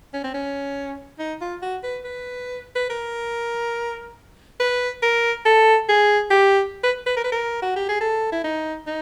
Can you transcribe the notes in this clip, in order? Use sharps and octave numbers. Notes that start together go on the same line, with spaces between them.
C#4
C4
C#4
D#4
F4
F#4
B4
B4
B4
A#4
B4
A#4
A4
G#4
G4
B4
B4
A#4
B4
A#4
F#4
G4
G#4
A4
E4
D#4
D#4